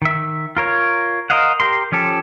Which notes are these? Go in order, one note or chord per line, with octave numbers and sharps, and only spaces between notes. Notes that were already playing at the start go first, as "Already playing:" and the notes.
D#3 E5
F4 A#4 C#5
A#4 C5 D#5 F5 F#5
G4 A#4 C6
F3 C#4 G4 A4